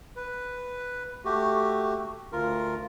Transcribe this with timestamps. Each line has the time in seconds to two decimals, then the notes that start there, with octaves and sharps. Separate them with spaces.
0.16 B4
1.25 A3 F#4 G4
2.32 D2 F4 A#4